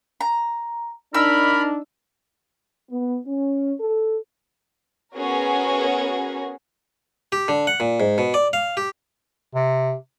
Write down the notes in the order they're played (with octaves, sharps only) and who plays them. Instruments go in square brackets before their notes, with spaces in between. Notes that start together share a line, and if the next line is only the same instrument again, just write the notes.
[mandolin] A#5
[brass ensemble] D4 D#4 [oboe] A#4 [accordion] B5 [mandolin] E6
[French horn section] B3
C#4
A4
[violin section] B3 C#4 F#4 G#4 A#4
[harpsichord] G4
D3
F#5
A#2
G#2
B2
D5
F5
G4
[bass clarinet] C3